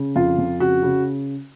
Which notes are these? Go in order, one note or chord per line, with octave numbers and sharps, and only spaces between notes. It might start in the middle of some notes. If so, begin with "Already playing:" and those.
Already playing: C#3
F2 F4
F2
C#3 F#4
C#3